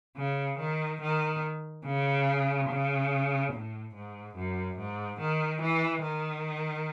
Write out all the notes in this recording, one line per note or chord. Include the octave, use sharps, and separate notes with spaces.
C#3
D#3
D#3
C#3
C#3
A2
G#2
F#2
G#2
D#3
E3
D#3